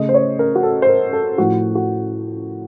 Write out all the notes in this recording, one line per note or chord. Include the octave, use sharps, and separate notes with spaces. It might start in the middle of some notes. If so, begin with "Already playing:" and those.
Already playing: C#3 A3 D#5
C5
C#5
A#4
F#4
A4
C5
A#4
A4
A2 F3 A3 F#4
F#4